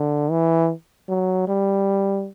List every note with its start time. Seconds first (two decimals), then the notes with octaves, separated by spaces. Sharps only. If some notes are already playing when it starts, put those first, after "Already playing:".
Already playing: D3
0.31 E3
1.09 F#3
1.48 G3